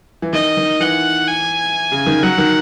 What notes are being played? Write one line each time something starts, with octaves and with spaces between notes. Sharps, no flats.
E3
D#3 D#5
D#3
E3 F#5
G#5
C#3
D#3
F#3 F#5
D#3